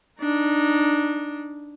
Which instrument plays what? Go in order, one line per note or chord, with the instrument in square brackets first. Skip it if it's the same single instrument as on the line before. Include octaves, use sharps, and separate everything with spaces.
[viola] D4 D#4